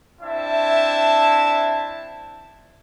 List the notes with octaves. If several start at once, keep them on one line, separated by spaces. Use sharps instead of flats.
C4 D4 E4 E5 A5